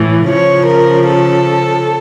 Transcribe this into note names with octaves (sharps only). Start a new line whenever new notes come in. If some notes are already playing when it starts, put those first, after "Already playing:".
Already playing: A2 E3
C#3 F3 C#5
A#4
A4